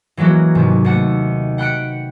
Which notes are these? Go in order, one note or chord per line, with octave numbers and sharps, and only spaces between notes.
E3 F#3 G#3 A#3 F#4
D#2 G#2 C3
D#2 A3 F#5
F#5 G5 B5 F#6 C#7 D7